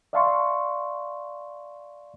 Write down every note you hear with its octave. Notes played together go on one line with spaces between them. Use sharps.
D5 E5 F5 A5 C6 C#6